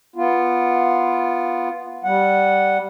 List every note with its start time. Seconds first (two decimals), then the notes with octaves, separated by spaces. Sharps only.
0.16 B3 F4
2.04 G3 F#5